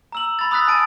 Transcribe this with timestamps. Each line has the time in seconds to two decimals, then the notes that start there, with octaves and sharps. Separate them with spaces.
0.12 A#5 E6 F#7
0.39 B5 A6
0.51 B5 D#6 E6 F#6 A6 B6
0.68 G#5 A5 A6 D7 D#7